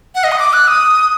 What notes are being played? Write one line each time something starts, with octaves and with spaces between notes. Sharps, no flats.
F#5
D#5
D#6
D6
F#6
D#6